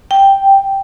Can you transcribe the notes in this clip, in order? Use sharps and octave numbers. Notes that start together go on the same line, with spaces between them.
G5